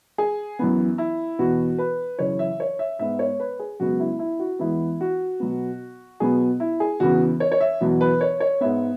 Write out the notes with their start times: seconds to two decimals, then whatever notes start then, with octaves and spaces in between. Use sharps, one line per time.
0.18 G#4
0.59 F#2 E3 B3
0.98 E4
1.39 E2 B2 B3 F#4
1.79 B4
2.19 F#2 C#3 E3 C#5
2.39 E5
2.60 C#5
2.79 E5
2.99 G#2 G#3 B3 E5
3.19 C#5
3.40 B4
3.59 G#4
3.80 F#2 C#3 G#3 B3 F#4
4.00 E4
4.19 E4
4.39 F#4
4.59 E2 E3 G#3 B3 E4
5.01 F#4
5.40 B2 F#3 B3
6.20 B2 F#3 B3 G#4
6.60 E4
6.80 G#4
7.00 E2 C#3 E3 B3 F#4
7.40 C#5
7.52 C#5
7.61 E5
7.81 E2 B2 F#3 B3
8.01 B4
8.21 C#5
8.40 C#5
8.61 G#2 G#3 B3 E5